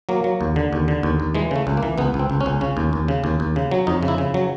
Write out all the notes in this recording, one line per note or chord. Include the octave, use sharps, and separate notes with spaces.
F#3 A#3
F#3
D#2
D3
D#2
D3
D#2
D#2
E3 G#3
C#3 A3
C#2
A#3
E3
C#2 B3
C#2
C4
C#2
C#4
C#2
C#3 C#4
D#2
D#2
C#3
D#2
D#2
C#3
F#3
F2 D#4
C#3
E4
C#3
F#3